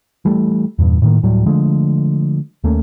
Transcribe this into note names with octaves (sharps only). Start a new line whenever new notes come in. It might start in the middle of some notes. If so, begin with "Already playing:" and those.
E3 G3 A3
E2 G2 A#2
A2 D#3 A#3
D1 A2 F#3 G3
D3 F3 G#3 A3
D#2 A3 A#3 C#4